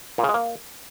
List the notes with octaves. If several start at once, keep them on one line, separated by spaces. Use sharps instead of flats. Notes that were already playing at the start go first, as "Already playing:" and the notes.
A#2
C#3
G#3
A#3